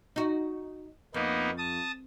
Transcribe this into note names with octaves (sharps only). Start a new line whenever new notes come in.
D#4 F#4
F2 A#3 B3 D#4
A5 D#6